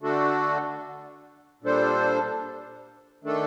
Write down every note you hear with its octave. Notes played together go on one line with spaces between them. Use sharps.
D3 A3 D4 F#4 A4
A#2 G3 D4 A4 C5
D#3 A3 D4 A4